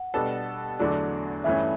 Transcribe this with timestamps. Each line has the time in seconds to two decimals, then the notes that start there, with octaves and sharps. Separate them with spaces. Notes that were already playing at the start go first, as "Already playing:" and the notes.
Already playing: F#5
0.14 B2 G3 B3 D4 A4
0.79 E2 D3 F#3 A3 D4
1.44 G2 E3 A3 C#4 E5